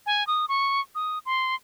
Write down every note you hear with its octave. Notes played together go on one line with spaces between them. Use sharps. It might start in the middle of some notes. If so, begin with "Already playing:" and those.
G#5
D#6
C#6
D#6
C6